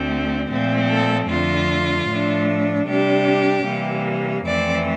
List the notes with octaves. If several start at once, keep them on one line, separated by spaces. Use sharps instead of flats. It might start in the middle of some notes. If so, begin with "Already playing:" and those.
Already playing: D2 D3 A3 C4
A#2 F3 A3 C4
A4
F2 D3 A3 F4
A2 F3 A3 D4
C3 G3 D4 G4
C3 E3 G3 A#3
F2 E3 A3 C4 D5